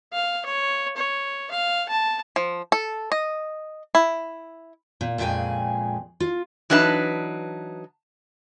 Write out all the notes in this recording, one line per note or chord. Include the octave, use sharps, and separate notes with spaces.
F5
C#5
C#5
F5
A5
F3
A4
D#5
E4
A#2
F2 A#2 C#3 G#3 G5 G#5
F4
E3 F#3 D4 D#4 B4 A5